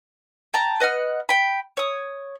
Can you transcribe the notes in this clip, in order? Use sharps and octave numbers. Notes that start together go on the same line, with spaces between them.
G5 A5 A#5
B4 D#5 F#5 F6
G5 B5
C#5 D#6